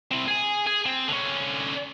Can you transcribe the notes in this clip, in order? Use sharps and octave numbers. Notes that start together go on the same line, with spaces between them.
C4 E4
G#4 G#5
G#4
C4
D3 C#4